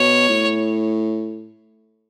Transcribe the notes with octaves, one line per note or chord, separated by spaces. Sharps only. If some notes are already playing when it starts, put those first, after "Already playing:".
Already playing: B2 C#5
A2